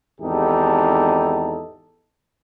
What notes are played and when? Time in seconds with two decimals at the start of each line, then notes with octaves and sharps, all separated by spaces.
0.20 G#1 E2 D#4 G4 A4